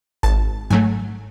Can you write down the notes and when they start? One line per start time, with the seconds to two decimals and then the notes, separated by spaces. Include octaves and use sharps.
0.23 G#1 A5
0.70 G#2 F#3 A3 G#5